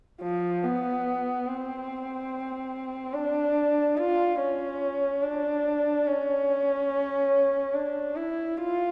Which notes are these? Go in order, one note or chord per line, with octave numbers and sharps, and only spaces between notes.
F3
B3
C4
D4
F4
C#4
D4
C#4
D4
E4
F4